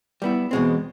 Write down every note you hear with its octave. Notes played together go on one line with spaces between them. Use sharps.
G3 B3 E4
E2 B2 G#3 C4